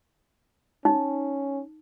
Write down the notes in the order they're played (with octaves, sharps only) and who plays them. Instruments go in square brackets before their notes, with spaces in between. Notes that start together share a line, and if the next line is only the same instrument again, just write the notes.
[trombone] C#4 [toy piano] D#4